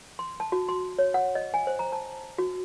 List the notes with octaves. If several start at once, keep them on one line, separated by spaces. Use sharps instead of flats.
C6
A5
F#4
C6
C#5
F#5
D#5
G#5
C5
A#5
A5
F#4